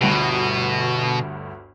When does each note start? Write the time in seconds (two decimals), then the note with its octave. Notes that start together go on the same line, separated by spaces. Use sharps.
0.01 G1 D2 G2 B2